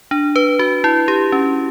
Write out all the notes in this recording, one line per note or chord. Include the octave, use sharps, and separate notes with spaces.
D4
B4
F#4
E4
G4
C#4